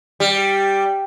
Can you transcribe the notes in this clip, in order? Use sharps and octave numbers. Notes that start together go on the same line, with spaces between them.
G3